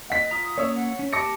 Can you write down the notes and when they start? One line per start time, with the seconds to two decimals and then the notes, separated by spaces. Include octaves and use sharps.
0.10 D#5 F#5 B6
0.31 F4 A#5 D#6
0.58 A#3 C#4 C#5 D#6 E6
0.76 F#5
0.99 C#4
1.13 G4 A5 D6 E6 A#6 C#7